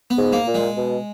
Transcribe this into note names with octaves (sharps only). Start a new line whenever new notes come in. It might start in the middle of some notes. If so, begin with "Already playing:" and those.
B3
G#2
A#3
A#2
G#3
B2